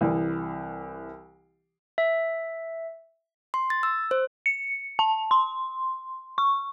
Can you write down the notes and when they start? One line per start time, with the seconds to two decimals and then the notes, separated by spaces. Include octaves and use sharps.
0.01 C2 E3
1.98 E5
3.54 C6
3.70 A6
3.83 E6
4.11 C5
4.46 C#7
4.99 A5
5.31 C6
6.38 C#6